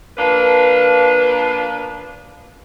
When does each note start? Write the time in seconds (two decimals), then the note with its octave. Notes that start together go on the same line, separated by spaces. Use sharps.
0.18 F3 A#3 D4 B4